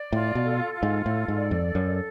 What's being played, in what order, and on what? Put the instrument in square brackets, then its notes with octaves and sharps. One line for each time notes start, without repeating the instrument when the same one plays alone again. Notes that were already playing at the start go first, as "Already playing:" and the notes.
Already playing: [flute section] D5
[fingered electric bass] A2 [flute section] F4
[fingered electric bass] B2
[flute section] A4
F4
[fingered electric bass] G#2
[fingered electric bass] A2 [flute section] A4
[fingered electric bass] G#2
[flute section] D5
[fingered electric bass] F2
[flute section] A4
[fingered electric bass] F#2